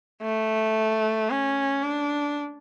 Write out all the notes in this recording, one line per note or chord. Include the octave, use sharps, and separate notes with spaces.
A3
C#4
D4